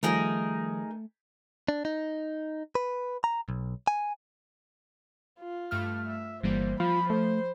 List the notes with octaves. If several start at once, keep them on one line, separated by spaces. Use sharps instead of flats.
D#3 F3 G3 A3 D#4 G#4 A#4
D4
D#4
B4
A#5
B1
G#5
F4
G2 A3 F6
E5
G1 E3 G3 A#3 C5
F3 F4 B5
A3 C5